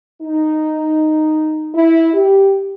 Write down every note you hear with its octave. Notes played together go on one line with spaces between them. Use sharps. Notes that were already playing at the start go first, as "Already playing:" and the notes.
D#4
E4
G4